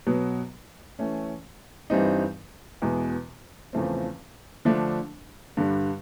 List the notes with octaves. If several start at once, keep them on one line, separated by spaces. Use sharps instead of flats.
B2 F#3 B3
E3 A3 C#4
G2 E3 G3 C4 D#4
E2 B2 G#3 B3
E2 C#3 F3 A3 C4
D3 F3 A3 D4
G2 D3 G3